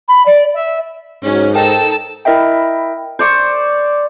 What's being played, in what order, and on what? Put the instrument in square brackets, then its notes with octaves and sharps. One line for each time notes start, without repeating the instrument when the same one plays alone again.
[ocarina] B5
D5
E5
[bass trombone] G#2 [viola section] F#3 C#4
[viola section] D#4 A4 [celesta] A#4 C5 G5 [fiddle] A5 E6
[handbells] E4 A#4 D#5 E5 G5
[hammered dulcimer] C5 D5 C#6